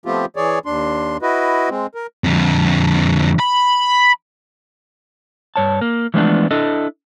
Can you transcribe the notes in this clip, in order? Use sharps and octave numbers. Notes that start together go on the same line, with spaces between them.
F3 A3 B3 C4 F4 G4
E3 G#4 C#5 D5
D#2 D4 C6
E4 F#4 B4 D#5
G#3 C4
A#4
F2 D3
B5
G2 C#5 A5
A#3
E3 F3 G#3 A3 B3 D4
D4 E4 A4 D#5